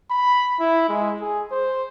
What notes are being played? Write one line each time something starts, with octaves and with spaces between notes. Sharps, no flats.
B5
E4
G#3
G#4
C5